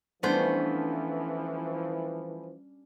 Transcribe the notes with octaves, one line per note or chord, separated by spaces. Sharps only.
E3 F3 G3 A3 B3 C#4 D4 C5